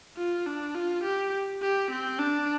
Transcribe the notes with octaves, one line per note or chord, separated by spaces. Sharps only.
F4
D4
F4
G4
G4
C4
D4